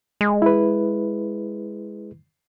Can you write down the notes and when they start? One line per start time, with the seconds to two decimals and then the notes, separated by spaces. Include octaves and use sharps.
0.21 G#3
0.42 E4 B4